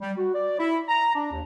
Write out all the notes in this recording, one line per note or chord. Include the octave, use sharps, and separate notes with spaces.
G3
F#4
D5
E4
A#5
D4
D#2